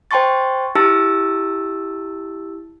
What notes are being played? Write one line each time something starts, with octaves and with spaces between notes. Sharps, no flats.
C5 G5 A5 C6 C#6 A6
E4 G4 A5 E6 A6